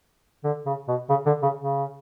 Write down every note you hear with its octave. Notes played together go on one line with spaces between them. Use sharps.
D3
C#3
B2
C#3
D3
C#3
C#3